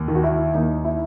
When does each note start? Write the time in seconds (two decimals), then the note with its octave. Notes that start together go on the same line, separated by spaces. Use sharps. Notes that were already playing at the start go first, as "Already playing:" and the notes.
Already playing: D#2
0.08 D#3
0.15 F#4
0.24 E4
0.54 D#2 D#4
0.84 E4